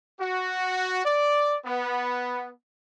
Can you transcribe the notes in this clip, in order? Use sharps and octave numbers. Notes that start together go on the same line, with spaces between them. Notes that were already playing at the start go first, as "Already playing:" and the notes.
F#4
D5
B3